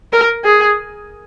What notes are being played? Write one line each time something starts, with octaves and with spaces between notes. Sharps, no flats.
A#4
G#4